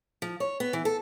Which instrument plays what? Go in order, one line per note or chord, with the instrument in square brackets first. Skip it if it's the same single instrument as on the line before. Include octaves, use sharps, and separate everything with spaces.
[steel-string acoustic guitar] F3
C#5
B3
E3
A4